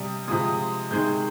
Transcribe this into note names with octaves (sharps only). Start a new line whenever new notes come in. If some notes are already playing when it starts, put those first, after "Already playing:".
Already playing: C3 G3 D#6
C3 F3 G#3 D#6
C3 D#3 G#3 G6